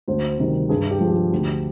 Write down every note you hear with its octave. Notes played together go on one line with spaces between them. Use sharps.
D2 C5
C3 D#3 G3
G2 G#4
G4
F3 G#3
G4
D2